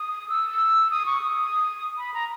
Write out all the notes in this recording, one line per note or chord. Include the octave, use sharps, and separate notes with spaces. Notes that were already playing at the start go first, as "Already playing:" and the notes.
Already playing: D#6
E6
D#6
C#6
D#6
B5
A#5